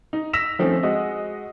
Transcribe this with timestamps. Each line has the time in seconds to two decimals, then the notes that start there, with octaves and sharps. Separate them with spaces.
0.13 D#4
0.33 E6 A#6 B6 E7 F7
0.59 D#3 F3 A3 C4 C#4
0.83 G#3 F#4 D#5